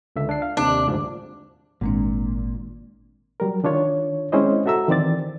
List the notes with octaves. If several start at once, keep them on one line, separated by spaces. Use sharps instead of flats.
C#2 D3 E5
D4 C7
F5
D#2 C3 D4
D2 G#2 F3
G#1 A#2 G#3 C4 D4
F#3 G3 A#4
D#3 D4 F4 C#5
G#3 C4 C#4 E4 C5 D#5
F#4 A4 E5 A#5 E6
D#3 E3 C4 D5 A6